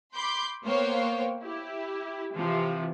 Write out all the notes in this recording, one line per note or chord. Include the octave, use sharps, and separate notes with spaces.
B5 C6 D6 G6
A#3 B3 C5 C#5 F5 G5
E4 G4
C3 E3 F3